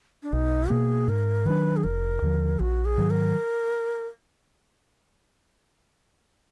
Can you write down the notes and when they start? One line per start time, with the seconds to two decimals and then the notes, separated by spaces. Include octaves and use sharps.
0.23 D4
0.33 B1 D#4
0.70 B2 A#3 G#4
1.08 G#2 A#4
1.45 D#3 F#3 D4 B4
1.77 G#4
1.84 F1 A#4
2.22 D#2 D3 F3
2.59 A#1 F#4
2.85 G#4
2.98 G#2 D#3 F#3
3.10 A#4